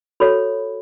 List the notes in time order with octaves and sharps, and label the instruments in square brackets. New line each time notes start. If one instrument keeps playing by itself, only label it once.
[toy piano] F#4 A4 C#5 B5